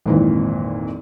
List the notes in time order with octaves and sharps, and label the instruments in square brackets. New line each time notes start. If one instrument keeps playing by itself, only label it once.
[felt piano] G#1 F2 A#2 D#3 E3